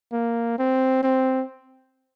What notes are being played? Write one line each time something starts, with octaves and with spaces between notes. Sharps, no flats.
A#3
C4
C4